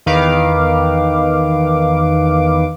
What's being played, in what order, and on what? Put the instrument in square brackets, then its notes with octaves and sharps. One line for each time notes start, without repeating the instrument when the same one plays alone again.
[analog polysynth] E2 D#3 B4 F5 D6